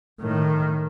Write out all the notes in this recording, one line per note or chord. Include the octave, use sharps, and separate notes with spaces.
A2 D#3